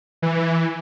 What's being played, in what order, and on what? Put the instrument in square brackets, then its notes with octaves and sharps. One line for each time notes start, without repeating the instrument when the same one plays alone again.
[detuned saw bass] E3